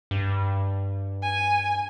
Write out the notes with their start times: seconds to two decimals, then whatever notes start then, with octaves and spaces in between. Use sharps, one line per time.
0.11 G2
1.22 G#5